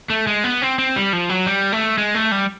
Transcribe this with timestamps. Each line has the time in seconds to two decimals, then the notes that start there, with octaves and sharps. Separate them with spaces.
0.10 A3
0.27 G#3
0.44 B3
0.62 C4
0.79 C4
0.96 G3
1.13 F3
1.29 F#3
1.46 G3
1.72 A3
1.98 G#3
2.15 A3
2.32 G3